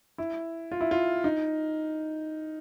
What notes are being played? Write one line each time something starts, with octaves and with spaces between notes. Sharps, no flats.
E4
F4
E4
F4
D#4